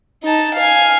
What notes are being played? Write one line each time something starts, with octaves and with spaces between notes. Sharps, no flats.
D#4 A5
F5 G#5